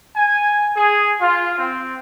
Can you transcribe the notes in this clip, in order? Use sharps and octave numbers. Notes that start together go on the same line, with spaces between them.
G#5
G#4
F4
C4